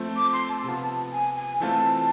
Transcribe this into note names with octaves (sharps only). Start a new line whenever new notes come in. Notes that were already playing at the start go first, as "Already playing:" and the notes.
Already playing: F3 A3 C4
D6
C6
A5
C3 F3 B3 F4
G#5
G#5
E3 A3 C4 F4 A5